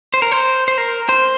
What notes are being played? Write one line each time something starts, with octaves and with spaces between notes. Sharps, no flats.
C5
A#4
C5
C5
A#4
C5